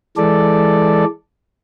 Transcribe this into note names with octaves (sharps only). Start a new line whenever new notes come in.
E3 G#3 A4 D5